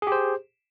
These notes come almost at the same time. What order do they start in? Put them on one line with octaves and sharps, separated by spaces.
G#4 G4 C5